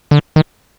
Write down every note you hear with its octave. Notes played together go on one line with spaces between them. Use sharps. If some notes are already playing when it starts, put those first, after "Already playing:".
D3
D#3